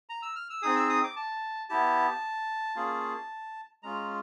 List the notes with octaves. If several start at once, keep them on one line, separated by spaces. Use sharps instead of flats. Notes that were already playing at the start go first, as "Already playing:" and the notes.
A#5
E6
F6
E6
C4 D#4 G#4 D#6
E6
D#6
D6
A5
B3 E4 G4 A5
A#3 C#4 F4 G#4
G#3 C#4 F4 A#5